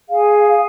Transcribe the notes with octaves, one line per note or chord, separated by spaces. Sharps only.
G#4 F5 G#5